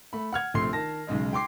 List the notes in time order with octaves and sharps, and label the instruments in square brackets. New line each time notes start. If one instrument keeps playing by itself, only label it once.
[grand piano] A3 B5
F#5 F6 G#6
A#1 C3 A3 C6 C7
D#3 A5 A#6
B1 C#3 G#3 D#4
G5 C6 D6 C7